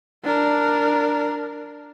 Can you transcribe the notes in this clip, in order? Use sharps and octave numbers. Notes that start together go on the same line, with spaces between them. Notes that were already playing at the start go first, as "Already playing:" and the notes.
D4 A#4